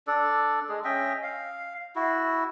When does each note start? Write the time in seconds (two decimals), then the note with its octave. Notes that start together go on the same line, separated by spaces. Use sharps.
0.07 D4 A4 D5
0.69 G#3 G#4
0.84 C#4 D#5 E5 G5
1.23 F5
1.95 E4 F#4